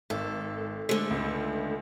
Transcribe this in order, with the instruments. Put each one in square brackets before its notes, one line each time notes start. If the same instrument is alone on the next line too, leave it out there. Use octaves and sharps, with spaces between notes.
[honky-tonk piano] G#1 [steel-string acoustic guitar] A4
[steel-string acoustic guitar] D3 A3 [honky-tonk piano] G#3
[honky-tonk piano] C#2